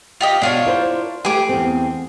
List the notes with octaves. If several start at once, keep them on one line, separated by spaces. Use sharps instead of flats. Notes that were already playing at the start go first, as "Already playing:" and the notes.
F4 G4 D#5
B2 D4 F4 C#5 F#5
E4 A#4 C5
A3 G4 G#4 B4 D6
E2 C4